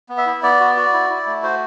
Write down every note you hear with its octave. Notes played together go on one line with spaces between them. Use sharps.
B3
E5
E4
B3 D5
F#4
F#4
E4
E4
A3
F#4 C5